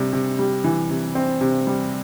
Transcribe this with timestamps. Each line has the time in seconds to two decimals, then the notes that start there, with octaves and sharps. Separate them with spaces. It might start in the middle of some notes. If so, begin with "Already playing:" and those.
Already playing: C3 G3
0.13 C3
0.39 G3
0.64 E3
0.90 C3
1.15 C4
1.41 C3
1.67 G3